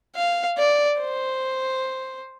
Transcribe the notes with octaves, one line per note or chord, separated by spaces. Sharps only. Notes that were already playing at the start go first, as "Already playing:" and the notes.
F5
D5
C5